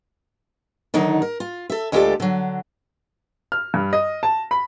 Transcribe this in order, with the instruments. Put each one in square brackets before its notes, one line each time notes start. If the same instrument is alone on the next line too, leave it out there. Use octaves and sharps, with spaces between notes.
[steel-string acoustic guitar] D3 D#3 F#3 D#4
A#4
F4
A4 E5
D2 G#3 F4 G4 A4 D5
D3 F#3
[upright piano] F6
G2
D#5
A5
B5